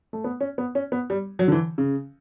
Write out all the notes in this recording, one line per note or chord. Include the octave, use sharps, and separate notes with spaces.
A3
B3
C#4
B3
C#4
B3
G3
F#3
D3
E3
C#3